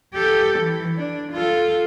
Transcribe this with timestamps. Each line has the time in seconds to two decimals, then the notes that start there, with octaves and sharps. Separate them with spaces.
0.14 G4 A4
0.60 E3
0.97 D4
1.33 F4 A4